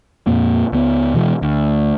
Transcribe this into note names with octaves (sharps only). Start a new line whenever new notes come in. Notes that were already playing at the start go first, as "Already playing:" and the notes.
F2 A#2 A#3
C#2 B3
B2 E3 F3 G#3
D2